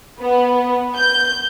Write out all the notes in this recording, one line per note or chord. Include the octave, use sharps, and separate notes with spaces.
B3
G6